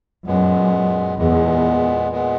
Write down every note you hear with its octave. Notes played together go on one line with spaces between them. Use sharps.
F#2 A#2 G#3 B3
E2 A#2 G#3 B3
A#2 G#3 B3